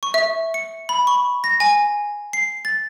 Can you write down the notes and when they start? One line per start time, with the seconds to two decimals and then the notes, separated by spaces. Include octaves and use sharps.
0.03 C#6
0.14 E5
0.54 C#7
0.89 B5
1.07 C#6
1.44 A#6
1.60 G#5
2.33 C7
2.65 A6